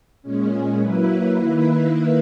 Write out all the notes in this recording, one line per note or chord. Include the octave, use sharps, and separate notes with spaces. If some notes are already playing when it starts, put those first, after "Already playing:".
A#2 G#3 C#4
F#3 A#3 E4 B4
D#3 A#3 E4 B4